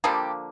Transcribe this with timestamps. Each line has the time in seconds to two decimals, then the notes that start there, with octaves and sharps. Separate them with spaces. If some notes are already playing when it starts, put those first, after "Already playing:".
0.04 D3 F3 G3 A#3 G4